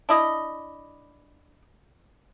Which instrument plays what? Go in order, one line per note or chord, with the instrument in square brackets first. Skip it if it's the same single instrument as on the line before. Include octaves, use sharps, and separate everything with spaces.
[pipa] D4 E4 D#5